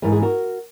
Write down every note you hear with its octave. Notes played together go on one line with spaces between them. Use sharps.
G#2 E3 A#4
G#4
F#4 A#4